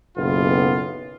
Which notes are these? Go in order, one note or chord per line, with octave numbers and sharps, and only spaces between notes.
F#1 B1 B3 F4